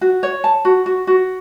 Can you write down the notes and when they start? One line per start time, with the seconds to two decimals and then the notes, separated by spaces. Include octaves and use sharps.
0.01 F#4
0.23 C#5
0.44 A5
0.65 F#4
0.86 F#4
1.07 F#4